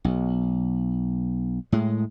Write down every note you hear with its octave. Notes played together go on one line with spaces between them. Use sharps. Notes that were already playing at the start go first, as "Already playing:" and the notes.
B1
A2 G#3